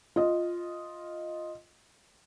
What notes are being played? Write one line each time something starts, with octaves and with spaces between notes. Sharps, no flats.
F4 D#5